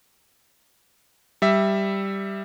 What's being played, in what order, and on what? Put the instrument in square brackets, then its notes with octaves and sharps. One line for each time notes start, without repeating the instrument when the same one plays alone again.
[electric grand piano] G3 E5